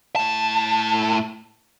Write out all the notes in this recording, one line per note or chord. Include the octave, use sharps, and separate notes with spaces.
A2 A5